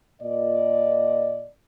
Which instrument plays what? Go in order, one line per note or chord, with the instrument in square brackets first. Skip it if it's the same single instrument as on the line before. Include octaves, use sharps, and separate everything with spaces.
[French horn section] A#2 D5 D#5